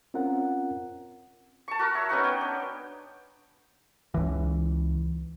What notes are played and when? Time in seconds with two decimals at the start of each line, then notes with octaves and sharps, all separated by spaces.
0.14 C4 C#4 F4 A#4 F#5
1.68 A5 C#6
1.79 F#4 A#4
1.94 C#5 E5
2.09 B3 C#4 D#4 F#5
2.24 G5
2.41 D4
4.14 C#2 E3